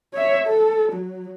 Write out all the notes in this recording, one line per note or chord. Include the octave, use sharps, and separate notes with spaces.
C#5 E5
A4
F#3